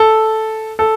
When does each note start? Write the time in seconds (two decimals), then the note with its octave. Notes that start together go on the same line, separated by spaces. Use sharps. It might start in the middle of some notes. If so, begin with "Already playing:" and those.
Already playing: A4
0.79 A4